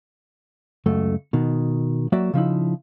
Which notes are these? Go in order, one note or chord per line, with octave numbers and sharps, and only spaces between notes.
C#2 F#2 A3
B2 D#3
F#3 A#3 F#4 D5 E5
C#3 F3 D#4 E4